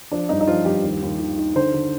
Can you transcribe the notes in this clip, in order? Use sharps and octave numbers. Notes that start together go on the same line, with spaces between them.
F3 D4
G2 D#4
D#4
F3 F4
G2 G4
D#2
D#2
D#3
D#3
D3 C5
D3